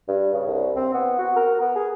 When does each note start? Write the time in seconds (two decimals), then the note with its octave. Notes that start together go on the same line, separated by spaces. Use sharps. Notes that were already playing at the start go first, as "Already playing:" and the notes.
0.09 G2
0.34 C#3
0.47 C2
0.76 C4
0.94 B3
1.19 F#4
1.36 A#4
1.61 B3
1.76 G#4